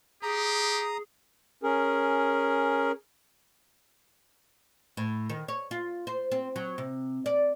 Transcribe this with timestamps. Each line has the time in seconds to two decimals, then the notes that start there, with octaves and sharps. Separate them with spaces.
0.23 G4 G#4 A#5 D#6
1.63 C#4 G#4 A#4
4.97 A2
5.30 D#3
5.48 C#5
5.71 F4
6.07 C5
6.32 C4
6.56 F#3
6.78 C3
7.26 D5